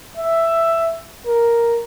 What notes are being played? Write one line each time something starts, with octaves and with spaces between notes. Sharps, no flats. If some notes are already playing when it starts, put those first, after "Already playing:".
E5
A#4